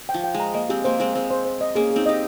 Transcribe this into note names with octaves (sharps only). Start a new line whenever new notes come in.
G5
F3
G5
G#3
A#5
A#3 D#5
G#3 C4 G4
A#3 C5
G#3 C4 C5
G#3 C4 C5
C5
C5
D#5
A#3 C#4 G#4
G#4
C4 D#4
G4 D#5